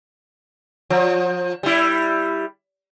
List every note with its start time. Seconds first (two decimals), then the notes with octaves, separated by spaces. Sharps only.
0.90 F3
1.63 G3 E4